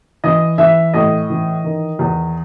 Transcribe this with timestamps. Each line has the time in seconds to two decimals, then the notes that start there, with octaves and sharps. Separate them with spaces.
0.24 E3 D#5
0.58 E3 E5
0.94 A2 D#5
1.30 E3
1.64 D#3
1.99 E2